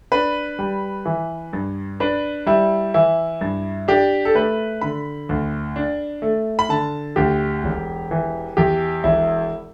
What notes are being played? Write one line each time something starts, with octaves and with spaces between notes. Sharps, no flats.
D4 B4
G3
E3
G2
D4 B4
G3 E4
E3 E4
G2
D4 G4
A4
A3 B4
D3 B5
D2
D4
A3
B5
D3 A5
D2 G4
E1
E3
E2 G4
E1 E4